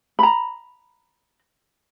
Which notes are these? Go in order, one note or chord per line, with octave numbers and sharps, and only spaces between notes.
A#5 B5